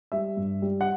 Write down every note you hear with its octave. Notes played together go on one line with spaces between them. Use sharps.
G3 E5
G2
G3
F#5